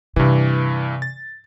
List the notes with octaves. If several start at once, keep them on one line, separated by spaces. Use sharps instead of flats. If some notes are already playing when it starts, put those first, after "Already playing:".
G2 C3 E3
A6